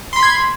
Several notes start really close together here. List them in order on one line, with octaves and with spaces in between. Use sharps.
C6 B5 B6 G#6